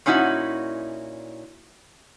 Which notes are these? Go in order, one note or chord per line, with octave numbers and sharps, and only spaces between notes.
A#2 C#4 D#4 E4 F#4